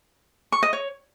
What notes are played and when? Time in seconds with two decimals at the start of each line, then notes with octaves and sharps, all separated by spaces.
0.52 C#6
0.63 D#5
0.73 C#5